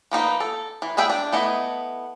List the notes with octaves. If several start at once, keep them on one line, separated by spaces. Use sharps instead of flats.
F3 A#3 D#4 B4
A4
E3
G3 B3 G#4 E5 G5
D4
A3 B3 E4 D#5